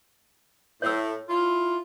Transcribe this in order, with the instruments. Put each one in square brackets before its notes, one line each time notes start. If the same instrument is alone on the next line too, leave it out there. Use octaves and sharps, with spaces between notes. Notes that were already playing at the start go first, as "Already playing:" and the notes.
[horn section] A2 [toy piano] C#5 E6
[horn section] E4 F4